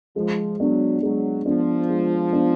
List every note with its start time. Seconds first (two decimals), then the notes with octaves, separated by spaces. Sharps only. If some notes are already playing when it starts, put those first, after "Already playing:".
0.16 F3 G#3
0.59 F#3 B3 D4
1.02 F#3 G#3
1.46 F3 B3 D4
1.89 G#3
2.32 B3 D4